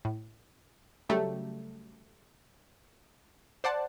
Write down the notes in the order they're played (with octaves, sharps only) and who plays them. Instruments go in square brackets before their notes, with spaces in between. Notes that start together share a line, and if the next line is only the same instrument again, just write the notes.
[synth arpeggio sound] A2
C#3 F#3 G3 A3 G4
C5 D5 F#5 A5